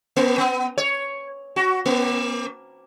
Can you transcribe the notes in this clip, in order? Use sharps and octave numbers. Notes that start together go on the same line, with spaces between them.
A#3
B3
C#5
F#4
A#3